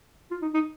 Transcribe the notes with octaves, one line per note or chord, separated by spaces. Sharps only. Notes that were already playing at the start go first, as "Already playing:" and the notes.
F4
D#4
D#4